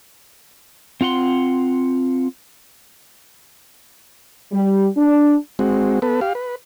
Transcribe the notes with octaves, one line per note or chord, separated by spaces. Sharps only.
C4 F4 F#5 C6
G3
D4
G#3 C4 F#4
B3 A4 B4
G4 F5
B4